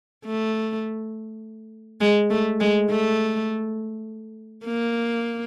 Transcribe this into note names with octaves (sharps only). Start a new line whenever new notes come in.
A3
G#3
A3
G#3
A3
A#3